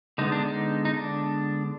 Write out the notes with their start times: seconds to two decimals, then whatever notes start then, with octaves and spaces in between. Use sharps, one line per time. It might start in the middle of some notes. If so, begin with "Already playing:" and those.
0.18 D3 G#3 B3 D#4
0.32 D4
0.46 D#4
0.85 D#4
0.94 D4